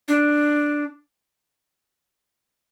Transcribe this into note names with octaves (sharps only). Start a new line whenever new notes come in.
D4